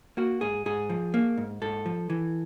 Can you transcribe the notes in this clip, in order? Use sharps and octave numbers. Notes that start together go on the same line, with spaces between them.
A#3 F#4
G#2 G#4
G#2 G#4
F3
A#3
G#2
G#2 A4
F3
E3